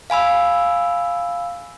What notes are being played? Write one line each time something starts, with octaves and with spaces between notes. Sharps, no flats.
F5 G#5 B5 E6